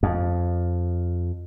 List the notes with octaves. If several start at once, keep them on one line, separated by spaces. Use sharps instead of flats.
F2